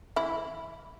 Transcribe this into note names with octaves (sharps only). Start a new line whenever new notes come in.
E3 E4